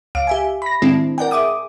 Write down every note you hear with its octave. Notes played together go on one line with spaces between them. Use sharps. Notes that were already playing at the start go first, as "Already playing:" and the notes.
C#2 F5 D7
G4 E5 G#5
B5 A#6
A2 D#3 G#3 C4 D4 E4
A#4 D5 F#5 G5
G#4 E5 D6 D#6